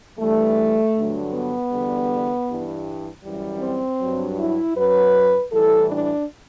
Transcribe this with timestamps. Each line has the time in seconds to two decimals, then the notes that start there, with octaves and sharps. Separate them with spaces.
0.19 G2 E3 G3 A3
0.94 G2 D3 F#3
1.33 B3
1.71 E2 D3 G3
2.47 G2 E3 G3
3.23 F#2 E3 G3
3.60 C4
4.00 G2 F#3
4.37 E4
4.75 F#2 F#3 B4
5.51 A2 E3 G3 A4
5.90 D4